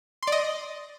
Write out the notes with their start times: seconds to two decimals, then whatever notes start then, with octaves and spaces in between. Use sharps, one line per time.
0.23 C6
0.27 D5
0.32 D#5